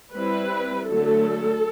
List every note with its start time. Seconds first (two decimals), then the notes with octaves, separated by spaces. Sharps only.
0.15 G3 C4 E4 B4
0.88 D3 F#3 A3 A4